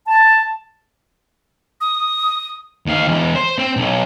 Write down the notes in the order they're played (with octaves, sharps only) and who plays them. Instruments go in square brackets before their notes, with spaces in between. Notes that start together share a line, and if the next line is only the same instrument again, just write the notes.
[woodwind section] A5
[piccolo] D#6
[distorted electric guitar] D#2 F5
E2 G#3
C5
C4
B1